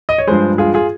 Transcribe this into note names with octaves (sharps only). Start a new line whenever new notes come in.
D#5
C#5
G2 F3 G#3 G#4 C5
F4 G#4
F4 G#4